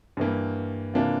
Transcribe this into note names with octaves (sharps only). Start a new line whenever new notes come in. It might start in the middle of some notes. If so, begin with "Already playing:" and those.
G2 E3 A#3
C3 E3 A#3 D4 F4